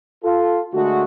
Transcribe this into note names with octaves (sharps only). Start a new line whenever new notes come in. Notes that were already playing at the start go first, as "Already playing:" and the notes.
F4 A4
D3 G#3 A3 F#4